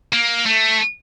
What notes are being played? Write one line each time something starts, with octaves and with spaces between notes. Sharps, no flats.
A#3
A3